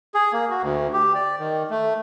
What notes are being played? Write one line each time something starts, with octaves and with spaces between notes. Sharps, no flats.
G#4
A#3
F#4
D2
G4
D5
D#3
A3